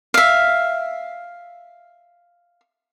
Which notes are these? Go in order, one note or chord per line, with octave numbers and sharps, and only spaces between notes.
E5 F5